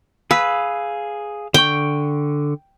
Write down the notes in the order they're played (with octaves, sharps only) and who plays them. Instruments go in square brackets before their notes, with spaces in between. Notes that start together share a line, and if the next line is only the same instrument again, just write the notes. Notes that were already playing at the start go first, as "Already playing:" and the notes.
[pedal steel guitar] G#4 F5 E6 [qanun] B4
[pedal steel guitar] D3 C#6 [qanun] G5